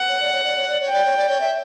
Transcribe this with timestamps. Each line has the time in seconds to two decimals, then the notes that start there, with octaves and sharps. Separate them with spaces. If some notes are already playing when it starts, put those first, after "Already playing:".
Already playing: F#5
0.09 C#5
0.20 D5
0.33 C#5
0.45 D5
0.57 C#5
0.68 D5
0.81 C#5
0.88 G5
0.93 D5
1.05 C#5
1.17 D5
1.29 C#5
1.41 E5